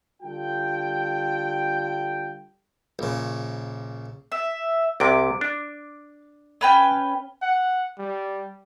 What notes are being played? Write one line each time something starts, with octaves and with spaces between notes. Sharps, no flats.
D3 G3 F4 A4 G5
A#1 C#3
E5
C2 C3 D6
D4
C#4 B4 G5
F#5
G3